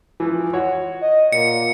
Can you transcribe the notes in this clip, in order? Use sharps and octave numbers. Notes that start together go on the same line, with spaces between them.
E3 F3
F#4 C#5
D#5
A#2 C#7